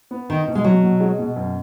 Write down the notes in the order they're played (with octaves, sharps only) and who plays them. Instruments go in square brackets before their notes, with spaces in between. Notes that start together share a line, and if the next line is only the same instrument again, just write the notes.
[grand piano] B3
[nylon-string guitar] D#3 [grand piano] D#4
[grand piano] B2
[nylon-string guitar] G#3
[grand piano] B2 [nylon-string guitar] F#3
[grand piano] B2
G#3
B2
F#2